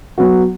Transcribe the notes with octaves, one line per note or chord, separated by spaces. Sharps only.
F#3 B3 F#4